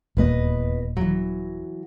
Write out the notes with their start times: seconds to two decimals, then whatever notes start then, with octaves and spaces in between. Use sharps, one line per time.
0.17 D#1 E2 A#3 B4 D#5
0.97 E3 F#3